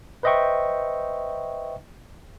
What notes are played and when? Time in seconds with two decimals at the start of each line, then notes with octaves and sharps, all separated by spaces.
0.23 B4 C5 D#5 E5 G5 C#6